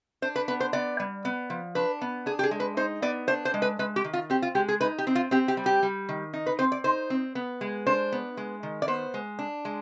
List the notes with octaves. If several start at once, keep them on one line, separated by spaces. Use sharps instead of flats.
D4 C5
B4
B3 B4
C5
B3 D5
G3
B3
F3
D4 B4
B3
D4 G#4
G4
G#4
G#3
B4
D#4 C5
B3 D5
D4 C5
C5
G#3
B4
G#3 B4
G4
D#3
F4
C4 G4
F4
G#3 G4
G#4
D#4 B4
G4
C4
F4
C4 G4
G4
G3
G4
G3
D#3
D#4
B4
C4 C5
D5
D#4 C5
C4
B3
G#3
D4 C5
B3
G#3
D#3
D5
B3 C5
G#3
D4
G#3